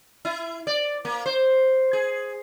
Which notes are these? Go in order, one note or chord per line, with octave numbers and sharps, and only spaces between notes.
E4
D5
A#3
C5
G#4